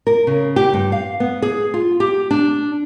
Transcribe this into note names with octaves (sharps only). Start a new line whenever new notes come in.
A#4
C#3
G4
G2
F5
B3
G#4
F4
G4
D4